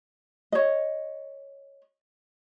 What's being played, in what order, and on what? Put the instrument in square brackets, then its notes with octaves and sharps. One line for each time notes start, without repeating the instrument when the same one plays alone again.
[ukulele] C#5 D#5